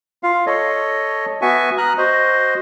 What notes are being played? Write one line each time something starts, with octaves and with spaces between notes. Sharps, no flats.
F4 F5
A4 C#5 D#5
B3 F#4 E5 G#5 C#6
A#5 D#6 F6 F#6
F#4 C5 D#5